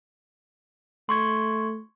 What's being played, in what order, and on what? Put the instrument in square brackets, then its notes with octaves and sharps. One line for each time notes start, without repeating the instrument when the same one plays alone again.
[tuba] A3 [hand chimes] C6 C#6 G#6